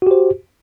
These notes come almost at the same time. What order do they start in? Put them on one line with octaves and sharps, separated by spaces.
F#4 G4 C5